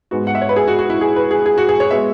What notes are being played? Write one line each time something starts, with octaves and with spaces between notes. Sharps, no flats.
G#2 G#3 B3 F#4
F#5
E5
C#5
B4
G#4
F#4
F#4
E4
G#4
B4
G#4
G#4
F#4
G#4
C#5
G#3 B3 E5